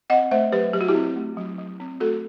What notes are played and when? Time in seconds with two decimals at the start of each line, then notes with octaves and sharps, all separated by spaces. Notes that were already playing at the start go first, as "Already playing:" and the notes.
0.10 C4 D#5 F#5
0.31 A3 C5 E5
0.52 F#3 G4 B4
0.73 F#3 G4
0.81 F#4
0.88 E4 G4
0.95 C4
1.16 A3
1.37 F#3
1.58 F#3
1.80 C4
2.00 A3 F#4 A4